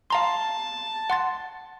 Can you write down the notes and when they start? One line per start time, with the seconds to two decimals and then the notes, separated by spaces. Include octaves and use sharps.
0.10 F5 A5 A#5 C6
1.10 F#5 C6 A6